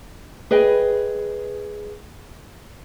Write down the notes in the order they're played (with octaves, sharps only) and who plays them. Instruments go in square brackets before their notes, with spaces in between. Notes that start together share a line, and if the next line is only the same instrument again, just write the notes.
[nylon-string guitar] G#4 B4 D#5 G5